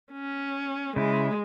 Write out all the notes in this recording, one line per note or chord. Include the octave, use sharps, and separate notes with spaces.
C#4
C#3 G#3 E4